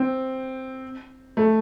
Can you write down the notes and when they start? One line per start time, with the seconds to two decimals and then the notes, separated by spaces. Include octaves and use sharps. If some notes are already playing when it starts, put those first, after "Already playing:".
Already playing: C4
1.37 A3